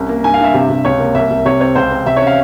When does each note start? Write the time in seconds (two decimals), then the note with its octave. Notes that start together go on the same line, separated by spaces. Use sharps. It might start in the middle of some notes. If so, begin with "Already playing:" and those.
Already playing: C2 C#4
0.09 A#3
0.23 G2 G#5
0.34 F5
0.39 G2 E5
0.54 C3
0.69 C3
0.85 C#2 C#5
1.00 A#3
1.15 C2 E5
1.30 C2
1.45 C3 C#5
1.61 C4 C#5
1.75 C#2 C5
1.91 C4
2.06 C3 E5
2.16 C#5
2.21 C#4
2.27 F5